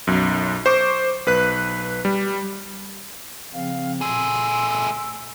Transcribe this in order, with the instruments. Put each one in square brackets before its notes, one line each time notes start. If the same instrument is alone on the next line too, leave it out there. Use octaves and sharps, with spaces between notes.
[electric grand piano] B1 F#2
C5 C#6 D6
B1 B4 F#6
G3
[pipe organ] C#3 F3 C4 [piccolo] F5
[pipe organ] A#2 C6 [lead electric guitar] A3 G#4 [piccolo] E6